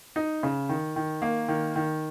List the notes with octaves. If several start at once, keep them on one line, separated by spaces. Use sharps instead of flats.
D#4
C#3
D#3
D#3
A#3
D#3
D#3